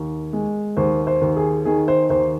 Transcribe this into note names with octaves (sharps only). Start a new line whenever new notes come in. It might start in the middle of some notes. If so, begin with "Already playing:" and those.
Already playing: D#2
G#3
D#2 C5
C5
D#2
G#4
D#3 G#4
C5
D#2 C5